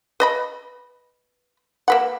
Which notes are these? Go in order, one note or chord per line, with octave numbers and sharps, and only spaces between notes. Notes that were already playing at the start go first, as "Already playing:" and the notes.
B4 D#5 B5
A#3 B4 F#5